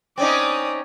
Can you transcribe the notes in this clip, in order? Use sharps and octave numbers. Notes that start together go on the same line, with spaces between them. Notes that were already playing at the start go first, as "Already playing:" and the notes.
C4 C#4 D#4 D5 D#6